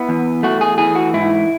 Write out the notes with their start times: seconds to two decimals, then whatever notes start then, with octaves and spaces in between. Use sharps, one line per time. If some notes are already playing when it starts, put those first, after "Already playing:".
Already playing: B3 E4
0.09 E2
0.43 A3 F#4
0.61 G#4
0.78 E3 G#4
0.95 F#4
1.14 G#2 E4